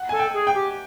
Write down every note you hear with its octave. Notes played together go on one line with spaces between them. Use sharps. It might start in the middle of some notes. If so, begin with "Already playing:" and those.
Already playing: F#5
A4 G#5
G5
G#4
G5
G4